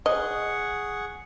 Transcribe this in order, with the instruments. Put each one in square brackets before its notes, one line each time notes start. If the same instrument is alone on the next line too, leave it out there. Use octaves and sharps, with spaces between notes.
[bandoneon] G#4 F#5 C#6 [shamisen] D#5